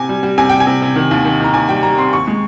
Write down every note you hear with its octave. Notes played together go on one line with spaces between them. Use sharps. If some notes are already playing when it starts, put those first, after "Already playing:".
Already playing: C3 G#5
G3
G3
C3 G#5
G3 G5
G#5
C3
C3
D#3
D#2
D#3
D#3 A#5
D#2 G#5
G3 G5
G3 A#5
C4 C6
D#2 C#6
G#3